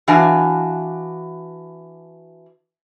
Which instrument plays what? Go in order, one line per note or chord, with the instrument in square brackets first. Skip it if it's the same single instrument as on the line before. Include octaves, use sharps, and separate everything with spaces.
[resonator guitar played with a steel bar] E3 D4 F#4 F5 G#5